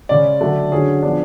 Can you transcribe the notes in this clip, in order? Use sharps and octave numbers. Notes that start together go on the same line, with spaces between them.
C#3 G#3 C#4 D5
D3 F#3 A3 D4
D3 F#3 C#4 G#4
F3 B3 D4